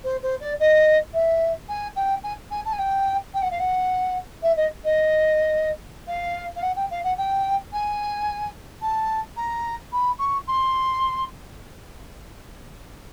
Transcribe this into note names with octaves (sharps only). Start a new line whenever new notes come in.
C5
C5
D5
D#5
E5
G#5
G5
G#5
G#5
A5
G#5
G5
G5
F#5
F5
F#5
E5
D#5
D#5
F5
F5
F#5
G5
F5
F#5
G5
G#5
A5
A#5
B5
C#6
C6